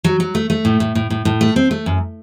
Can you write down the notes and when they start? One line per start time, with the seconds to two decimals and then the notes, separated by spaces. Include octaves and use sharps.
0.04 F#3
0.20 F#3
0.35 A3
0.50 A3
0.65 A2
0.80 A2
0.95 A2
1.10 A2
1.25 A2
1.41 A3
1.56 C4
1.71 A3
1.86 F#2